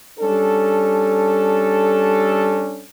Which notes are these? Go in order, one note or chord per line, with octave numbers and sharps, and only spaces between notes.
G3 C#4 D4 A4